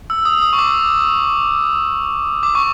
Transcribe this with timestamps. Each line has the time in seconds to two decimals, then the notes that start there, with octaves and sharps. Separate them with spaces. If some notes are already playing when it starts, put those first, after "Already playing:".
0.10 E6
0.25 D#6
0.42 D#6
0.53 C#6
0.59 D6
2.43 D6
2.55 C#6